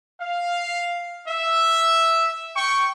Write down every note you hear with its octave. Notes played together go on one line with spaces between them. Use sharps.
F5
E5
G5 C#6